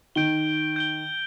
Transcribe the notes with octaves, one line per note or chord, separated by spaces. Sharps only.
D#3 G6 D7 G7
G6 D7 G7